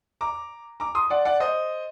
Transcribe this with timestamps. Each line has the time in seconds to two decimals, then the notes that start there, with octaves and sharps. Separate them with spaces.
0.21 A#5 D6
0.80 A#5 D6
0.95 C6 D#6
1.10 D5 F#5
1.25 D5 F#5
1.40 C5 D#5